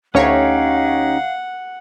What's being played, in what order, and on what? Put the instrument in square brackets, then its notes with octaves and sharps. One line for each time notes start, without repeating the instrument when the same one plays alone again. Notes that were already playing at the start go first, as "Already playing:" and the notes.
[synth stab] D2 C#5 [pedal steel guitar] C#4 D#4 G4 [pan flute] F5 [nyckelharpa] F#5